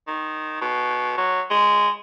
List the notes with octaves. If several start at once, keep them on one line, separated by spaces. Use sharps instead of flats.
D#3
B2
F#3
G#3